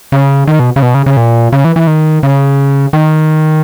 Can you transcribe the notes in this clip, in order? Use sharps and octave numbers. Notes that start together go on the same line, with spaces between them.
C#3
D#3
B2
C#3
B2
C#3
C#3
A#2
C#3
E3
E3
D#3
C#3
D#3